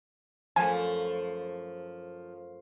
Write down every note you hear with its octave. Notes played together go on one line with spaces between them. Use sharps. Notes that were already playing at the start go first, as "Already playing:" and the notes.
F#2 F3 A3 D5 G#5